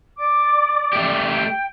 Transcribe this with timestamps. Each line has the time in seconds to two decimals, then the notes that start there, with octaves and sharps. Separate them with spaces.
0.18 D5 D6
0.93 A3 G4
1.28 G5